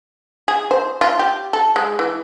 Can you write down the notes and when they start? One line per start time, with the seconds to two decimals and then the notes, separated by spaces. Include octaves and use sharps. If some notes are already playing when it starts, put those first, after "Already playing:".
0.48 G#4
0.71 C5
1.01 F4
1.19 G4
1.53 A4
1.76 G#3
1.99 E3